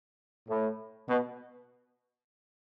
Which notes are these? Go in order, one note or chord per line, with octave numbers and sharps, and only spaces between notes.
A2
B2